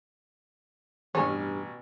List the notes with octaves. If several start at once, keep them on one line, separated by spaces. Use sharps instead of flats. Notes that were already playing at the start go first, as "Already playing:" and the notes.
A1 G2 B2 C#4 C#5 G#5